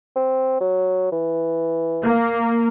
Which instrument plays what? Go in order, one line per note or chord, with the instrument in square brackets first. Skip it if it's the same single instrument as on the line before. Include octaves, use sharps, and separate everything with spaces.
[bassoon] C4
F#3
E3
[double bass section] A#3